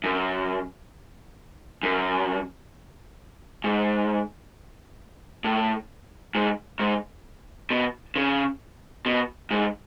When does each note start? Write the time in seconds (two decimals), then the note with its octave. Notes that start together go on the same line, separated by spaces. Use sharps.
0.04 F#2
1.83 F#2
3.64 G#2
5.44 A2
6.35 G#2
6.79 G#2
7.70 B2
8.16 C#3
9.06 B2
9.51 G#2